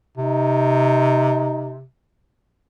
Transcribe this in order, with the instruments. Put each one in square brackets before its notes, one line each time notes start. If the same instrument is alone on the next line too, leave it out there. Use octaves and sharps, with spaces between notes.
[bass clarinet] C3 [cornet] D#4